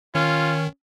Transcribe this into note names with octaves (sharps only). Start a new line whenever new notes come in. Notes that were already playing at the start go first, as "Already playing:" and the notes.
D#3 C#4 F4